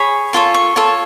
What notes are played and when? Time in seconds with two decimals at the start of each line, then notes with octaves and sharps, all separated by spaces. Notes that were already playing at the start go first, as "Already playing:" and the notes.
Already playing: G#4 C#5 B5
0.33 F4 A4 C#5 A5
0.54 C#6
0.76 F4 A4 C#5 A5